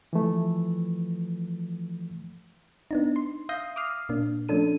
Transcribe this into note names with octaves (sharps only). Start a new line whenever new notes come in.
E3 F3 A3
B3 D4 D#4
C6
E5 F5 D#6 G6 A#6 C7
D6 D#6 F6 C7
A#2 A#3 D4
F3 A3 C#4 D4 A4 D#7